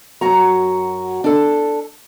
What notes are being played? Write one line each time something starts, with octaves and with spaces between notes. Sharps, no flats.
F#2 F#3 F#4 A#5
D4 A4